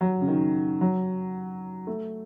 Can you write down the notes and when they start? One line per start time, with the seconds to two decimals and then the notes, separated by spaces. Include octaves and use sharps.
0.01 F#3
0.21 C#3
0.28 D#3
0.81 F#3
1.87 A3